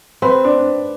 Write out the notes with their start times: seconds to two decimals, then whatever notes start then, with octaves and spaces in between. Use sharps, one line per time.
0.22 C4 B4
0.44 D4